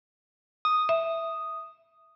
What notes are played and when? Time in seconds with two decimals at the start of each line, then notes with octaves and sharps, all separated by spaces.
0.65 D#6
0.89 E5